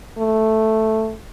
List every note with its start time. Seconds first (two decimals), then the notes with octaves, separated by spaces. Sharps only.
0.18 A3